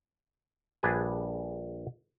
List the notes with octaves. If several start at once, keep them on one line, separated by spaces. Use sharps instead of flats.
A#1 G3 D4 G#4 B4 G#5